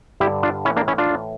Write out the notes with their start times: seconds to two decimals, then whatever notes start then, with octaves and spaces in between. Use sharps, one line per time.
0.20 G2 D3 E4 G4
0.43 D4 F4
0.65 A2 E3 C#4 E4
0.76 A#3 D4
0.88 C#4 E4
0.98 D4 F4
1.10 A2 E3